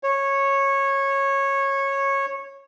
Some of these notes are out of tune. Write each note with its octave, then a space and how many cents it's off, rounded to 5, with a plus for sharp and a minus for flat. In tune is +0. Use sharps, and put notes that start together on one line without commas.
C#5 -15